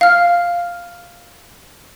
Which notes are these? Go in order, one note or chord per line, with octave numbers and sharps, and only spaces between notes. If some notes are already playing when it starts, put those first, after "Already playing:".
F5 F6